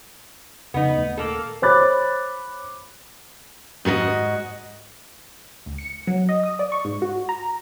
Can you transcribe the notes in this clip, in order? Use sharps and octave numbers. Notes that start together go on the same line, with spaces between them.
F2 C#3 B3 D#4
D#1 A3
A#3 A4
C5 C#5 B5 D6 F#6 A6
G#2 F#4 A4 D#5
D2
C#7
F#3
D#5
D#6
D5
C#6
G#2
F#4
A#5